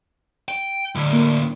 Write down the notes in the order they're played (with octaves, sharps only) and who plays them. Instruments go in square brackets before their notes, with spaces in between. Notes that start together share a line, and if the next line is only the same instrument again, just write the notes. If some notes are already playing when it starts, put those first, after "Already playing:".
[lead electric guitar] G5
A2 D3
[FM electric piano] A#3